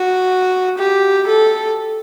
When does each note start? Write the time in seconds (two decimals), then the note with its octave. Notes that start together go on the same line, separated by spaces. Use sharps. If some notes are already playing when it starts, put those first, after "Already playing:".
Already playing: F#4
0.78 G4
1.26 A4